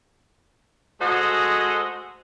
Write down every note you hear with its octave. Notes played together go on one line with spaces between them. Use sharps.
G#3 A3 F#4 G#4 C5 D#5